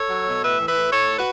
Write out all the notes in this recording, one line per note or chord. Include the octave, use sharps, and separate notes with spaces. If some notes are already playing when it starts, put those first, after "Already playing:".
Already playing: A4 C#5
F#3
B2
A2 B4 E5
E3
B4 E5
A2
A2 A4 C#5
A2
F#4 B4